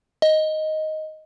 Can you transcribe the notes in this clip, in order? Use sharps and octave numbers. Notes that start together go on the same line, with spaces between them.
D#5